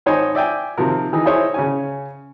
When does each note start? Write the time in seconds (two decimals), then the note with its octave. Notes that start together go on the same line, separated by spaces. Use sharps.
0.06 G#1 D#4 C5 C#5 G#5
0.35 D5 E5 G5 G#5
0.78 C3 D#3 F3 A#4
1.13 E3 D#4 G#4
1.25 D#4 E4 G#4 C5 C#5
1.54 C#3 C#4 G#5